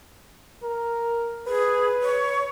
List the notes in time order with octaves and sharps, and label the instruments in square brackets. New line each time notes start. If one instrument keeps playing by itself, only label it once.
[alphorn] A#4
[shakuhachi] G#4 [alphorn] B4
[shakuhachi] C#5